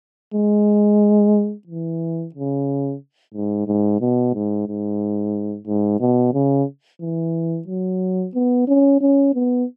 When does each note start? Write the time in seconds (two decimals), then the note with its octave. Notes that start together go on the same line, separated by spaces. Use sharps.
0.34 G#3
1.67 E3
2.35 C#3
3.34 G#2
3.67 G#2
4.01 B2
4.34 G#2
4.68 G#2
5.67 G#2
6.00 B2
6.34 C#3
7.01 E3
7.68 F#3
8.34 B3
8.68 C#4
9.01 C#4
9.34 B3